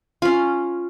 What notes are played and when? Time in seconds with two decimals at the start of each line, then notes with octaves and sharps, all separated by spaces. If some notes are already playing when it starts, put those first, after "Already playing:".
0.22 C#4 F4